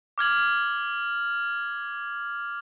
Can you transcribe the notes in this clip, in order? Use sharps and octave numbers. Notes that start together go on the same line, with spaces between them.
D6 F6 G#6 F#7